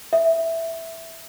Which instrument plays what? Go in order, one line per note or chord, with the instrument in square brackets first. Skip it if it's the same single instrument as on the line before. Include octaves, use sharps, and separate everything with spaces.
[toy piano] E5